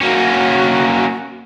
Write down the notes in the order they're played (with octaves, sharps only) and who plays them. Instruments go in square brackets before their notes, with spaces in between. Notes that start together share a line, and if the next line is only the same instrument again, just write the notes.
[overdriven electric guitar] A#3 C#4 [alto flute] F#4